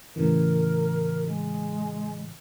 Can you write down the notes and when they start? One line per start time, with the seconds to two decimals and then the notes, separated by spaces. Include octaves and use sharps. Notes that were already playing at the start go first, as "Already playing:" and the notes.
0.16 A2 C#3 E3 A#4
1.27 G#3